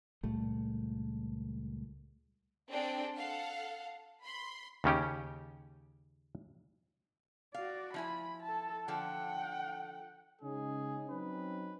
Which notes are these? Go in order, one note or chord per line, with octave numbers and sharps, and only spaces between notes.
C#2 A#2 G3 A3
C4 D4 G#4 A4 D5 G5
A4 F5 F#5
B5 C6
D#2 C#3 C#4 G4
F#4 D5 F5
F3 E4 G#5 B5
A4 A5
D3 F3 A4 F#5 G5
C#3 G#3 C#4 D#4 G#4
F#3 C4 C#4 D#4 B4